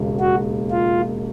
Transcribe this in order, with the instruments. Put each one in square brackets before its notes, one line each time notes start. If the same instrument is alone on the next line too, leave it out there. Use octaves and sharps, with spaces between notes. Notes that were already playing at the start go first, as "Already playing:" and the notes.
Already playing: [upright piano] E1 D#2 C#3
[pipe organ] F#4
F4